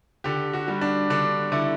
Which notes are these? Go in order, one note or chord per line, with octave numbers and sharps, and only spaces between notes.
D3 G4
F#4
G3
D4
D3 D4
D3 E4